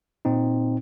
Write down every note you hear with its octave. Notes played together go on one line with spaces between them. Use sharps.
A#2 C4 D#4